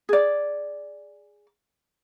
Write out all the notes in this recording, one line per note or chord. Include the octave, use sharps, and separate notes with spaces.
G#4 D5